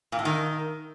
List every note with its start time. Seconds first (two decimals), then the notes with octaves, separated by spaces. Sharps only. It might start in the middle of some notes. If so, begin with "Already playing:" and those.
0.12 A#2
0.19 A2
0.25 D#3